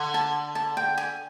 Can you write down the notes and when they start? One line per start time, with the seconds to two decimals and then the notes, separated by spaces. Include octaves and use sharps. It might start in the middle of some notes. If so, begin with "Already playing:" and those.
Already playing: D3
0.14 A5
0.55 A5
0.77 G5
0.98 G#5